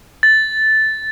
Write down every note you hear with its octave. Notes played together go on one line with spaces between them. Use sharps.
A6